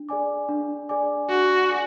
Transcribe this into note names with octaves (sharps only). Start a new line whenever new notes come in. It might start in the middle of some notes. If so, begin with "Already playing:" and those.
Already playing: D4
G#4 D5 G#5 D6
D4
G#4 D5 G#5 D6
D4 F#4
G#4 D5 G#5 D6